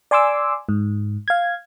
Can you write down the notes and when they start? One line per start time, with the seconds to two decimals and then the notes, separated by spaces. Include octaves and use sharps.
0.11 D5 G#5 C6 D6 E6
0.69 G#2
1.28 F5 G#6